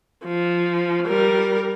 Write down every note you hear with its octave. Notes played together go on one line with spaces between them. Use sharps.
F3
G3 A#4